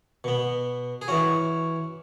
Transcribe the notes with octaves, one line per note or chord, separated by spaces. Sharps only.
B2 B3
G#4
E3 C#4 F#4